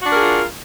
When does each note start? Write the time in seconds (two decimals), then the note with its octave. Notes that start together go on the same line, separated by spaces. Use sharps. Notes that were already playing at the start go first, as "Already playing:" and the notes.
0.01 F#4
0.06 D4
0.11 A#4
0.16 G#4
0.21 F4